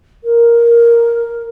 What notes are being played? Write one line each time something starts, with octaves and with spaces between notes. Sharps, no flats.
A#4